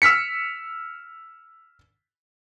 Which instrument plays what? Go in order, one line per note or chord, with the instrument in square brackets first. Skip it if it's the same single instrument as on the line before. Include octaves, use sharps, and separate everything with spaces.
[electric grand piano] E6 F6 B6 C#7